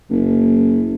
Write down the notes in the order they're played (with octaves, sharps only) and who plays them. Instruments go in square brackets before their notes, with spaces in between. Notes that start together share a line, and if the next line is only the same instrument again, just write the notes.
[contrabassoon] F#1